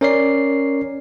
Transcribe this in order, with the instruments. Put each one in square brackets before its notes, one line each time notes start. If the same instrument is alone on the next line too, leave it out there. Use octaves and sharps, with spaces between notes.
[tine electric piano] C#4 A#4 C#5 D5 C7